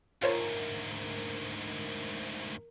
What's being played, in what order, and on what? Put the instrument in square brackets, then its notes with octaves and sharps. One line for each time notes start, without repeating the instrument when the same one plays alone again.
[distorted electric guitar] D2 G#2 [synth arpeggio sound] F4 C5 C#5 [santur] A#4 A5